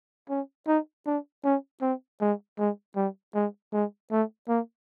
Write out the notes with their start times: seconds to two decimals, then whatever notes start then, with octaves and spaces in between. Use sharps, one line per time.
0.29 C#4
0.67 D#4
1.06 D4
1.44 C#4
1.81 C4
2.21 G#3
2.59 G#3
2.96 G3
3.35 G#3
3.73 G#3
4.11 A3
4.48 A#3